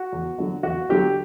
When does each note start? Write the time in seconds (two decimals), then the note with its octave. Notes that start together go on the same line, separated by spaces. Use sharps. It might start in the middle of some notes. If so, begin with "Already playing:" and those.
Already playing: F#4
0.12 E2
0.38 D3 F#3
0.63 E2 F#4
0.89 D3 F#3 G4